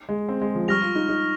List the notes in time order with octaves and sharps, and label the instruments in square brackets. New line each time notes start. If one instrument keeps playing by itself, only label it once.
[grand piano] G#3
C4
G#3
F3
[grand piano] G3 [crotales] C#6 F6 A#6 F7
[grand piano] F4
D#4
D#4